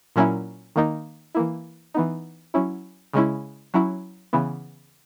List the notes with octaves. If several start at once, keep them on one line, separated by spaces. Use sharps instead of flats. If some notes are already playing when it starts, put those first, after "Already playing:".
A#2 F#3 A#3 C#4 E4
D#3 A#3 D#4
E3 A#3 E4
E3 B3 D#4
F#3 C#4 E4
C#3 G#3 C#4 E4
F#3 C#4 E4
C#3 E3 B3 E4